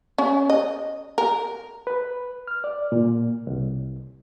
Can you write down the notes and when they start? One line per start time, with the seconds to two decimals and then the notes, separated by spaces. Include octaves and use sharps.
0.18 C#4
0.50 D#5
1.18 A#4
1.87 B4
2.47 F6
2.64 D5
2.92 A#2
3.47 C2